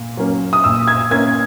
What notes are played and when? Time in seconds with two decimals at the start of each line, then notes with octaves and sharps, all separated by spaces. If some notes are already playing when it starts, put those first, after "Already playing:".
Already playing: A#2
0.17 F#3 A#3 C#4
0.53 D#6
0.64 A#2 E6
0.88 G#6
1.11 A#3 C#4 G#6